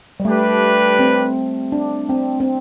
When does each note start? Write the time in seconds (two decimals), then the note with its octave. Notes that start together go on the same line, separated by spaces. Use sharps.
0.20 G3
0.25 A3 D4 G4 B4
0.99 C4
1.72 D4
2.09 C4
2.40 C4